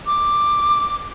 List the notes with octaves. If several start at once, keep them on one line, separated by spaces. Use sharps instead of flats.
D6